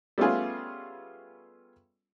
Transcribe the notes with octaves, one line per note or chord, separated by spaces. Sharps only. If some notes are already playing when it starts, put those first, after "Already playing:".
G3 A3 B3 C#4 F4 G#4